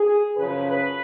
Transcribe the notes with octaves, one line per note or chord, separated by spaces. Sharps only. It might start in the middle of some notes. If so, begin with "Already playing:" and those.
Already playing: G#4
F#2 C#3 F3 B4
B4